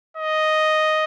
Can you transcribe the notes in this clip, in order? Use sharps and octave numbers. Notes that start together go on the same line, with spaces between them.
D#5